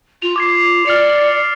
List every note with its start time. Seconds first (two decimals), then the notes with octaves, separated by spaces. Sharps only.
0.22 F4 F7
0.36 D6 G#6 C7
0.86 D5 F6 C#7 F7
1.18 A6 C7 C#7